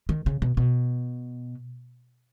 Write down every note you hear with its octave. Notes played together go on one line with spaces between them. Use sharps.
D#3
C#3
B2
B2